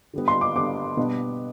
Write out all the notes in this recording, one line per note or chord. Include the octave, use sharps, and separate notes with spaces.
D3 G3 B3
C6
D6
D3 G3 B3 D6
B2 G3 B3 D4